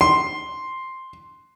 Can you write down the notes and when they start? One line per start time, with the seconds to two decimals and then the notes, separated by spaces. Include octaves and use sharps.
0.01 C6